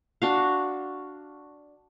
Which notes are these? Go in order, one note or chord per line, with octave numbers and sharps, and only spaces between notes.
D4 F#4 F5